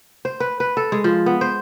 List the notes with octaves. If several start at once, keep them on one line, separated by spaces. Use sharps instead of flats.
C5
B4
B4
A4
G#3
F3
B3
C5